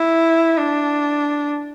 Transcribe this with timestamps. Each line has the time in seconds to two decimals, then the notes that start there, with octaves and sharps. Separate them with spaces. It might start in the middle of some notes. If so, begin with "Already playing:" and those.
Already playing: E4
0.57 D4